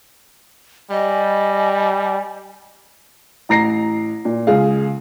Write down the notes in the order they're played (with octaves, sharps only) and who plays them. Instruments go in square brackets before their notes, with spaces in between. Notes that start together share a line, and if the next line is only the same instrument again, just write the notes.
[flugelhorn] G3 [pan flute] D#5 [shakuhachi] G#5
[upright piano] A1 A#5 A#6 C7
A#2
C#2 G#4 F5